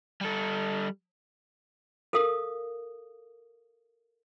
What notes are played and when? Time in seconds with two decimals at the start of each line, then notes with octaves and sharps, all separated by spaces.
0.21 G3 A4
2.13 A4 A#4 F5 D#6